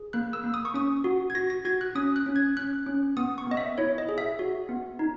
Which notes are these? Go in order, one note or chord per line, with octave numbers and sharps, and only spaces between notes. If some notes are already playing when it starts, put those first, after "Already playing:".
Already playing: G#4
A#3 F#6
E6
A#3
D#6
C#6
C#4 D#6
F#4
G#6
F#4 A#6
A#6
F#4 G#6
F#6
C#4 D#6
F#6
C#4
G#6
C#4 F#6
C#4
B3 D#6
C#6
B3 D#5
E5
E4 C#5
D#5
G#4
E5
F#4
B3
D#4